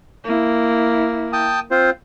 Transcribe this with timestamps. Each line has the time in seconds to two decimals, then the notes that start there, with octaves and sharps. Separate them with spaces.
0.25 A#3 E4
1.33 G5 A5 D#6
1.71 C4 F4 C5